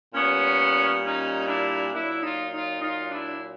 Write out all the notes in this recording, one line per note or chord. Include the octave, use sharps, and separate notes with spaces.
A#2 G3 B3 C#4
C#4 D#4
D4 E4
A#2 F#3 D4 E4
D#4 F4
D#4 F4
D#4 F4
D4 E4